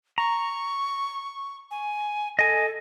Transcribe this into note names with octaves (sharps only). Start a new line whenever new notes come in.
A#5 C#6
G#5
A4 D#5 G#5